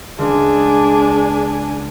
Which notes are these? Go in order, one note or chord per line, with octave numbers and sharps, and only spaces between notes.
C#2 D4 G#4 G#5